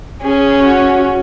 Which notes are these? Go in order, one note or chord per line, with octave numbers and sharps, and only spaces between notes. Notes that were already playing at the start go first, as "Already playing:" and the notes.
C#4 G#4
F#4